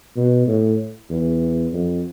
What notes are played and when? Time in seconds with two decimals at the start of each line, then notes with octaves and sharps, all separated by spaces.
0.16 B2
0.47 A2
1.10 E2
1.73 F2